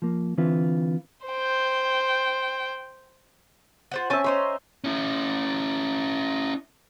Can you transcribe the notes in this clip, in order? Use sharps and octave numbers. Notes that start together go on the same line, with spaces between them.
F3 A#3
D3 E3 C4 F4 B4
C5 G5
F4 C5 F#5
C4 C#4 E5 G#5 A5
C#4 D#4 C5 C6
C#4 E4